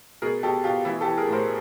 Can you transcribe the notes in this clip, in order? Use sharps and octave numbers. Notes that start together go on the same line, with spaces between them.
B2 G#4 A#4
B2 G4 A4
B2 F4 G4
E3 E4
G4 A4
E3
G#4 A#4
A2 A#4 C5